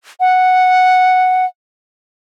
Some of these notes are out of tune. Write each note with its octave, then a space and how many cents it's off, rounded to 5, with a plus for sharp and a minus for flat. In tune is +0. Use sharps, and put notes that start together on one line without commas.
F#5 -5